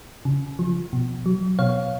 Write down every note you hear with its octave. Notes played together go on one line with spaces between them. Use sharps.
C#3
F3
B2
F#3
B2 C#5 F5